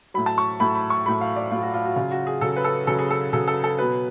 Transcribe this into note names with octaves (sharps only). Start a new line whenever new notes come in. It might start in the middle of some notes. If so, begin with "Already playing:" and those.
A2 F#3 B5
A5
C#6
A2 F#3 B5
B5
C#6
A2 F#3 B5
F5
D5
A2 F#3 F4
F#4
F4
F#4
C#3 F#3 F4
F#4
G#4
C#3 F#3 A4
B4
A4
C#3 F#3 A4
G#4
A4
C#3 F#3 A4
A4
A4
B2 F#3 B4